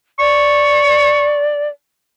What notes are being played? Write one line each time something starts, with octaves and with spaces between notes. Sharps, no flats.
D5 C#6